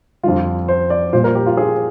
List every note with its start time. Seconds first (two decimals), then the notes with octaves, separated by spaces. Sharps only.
0.24 F2 D3 G3 F4
0.68 C5
0.90 D5
1.13 A#2 G3 C5
1.24 A#4
1.35 G4
1.46 F4
1.57 G#4